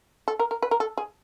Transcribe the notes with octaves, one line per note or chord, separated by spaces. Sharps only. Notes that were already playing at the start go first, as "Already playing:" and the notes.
A4
A#4
A#4
B4
A#4
A4
G#4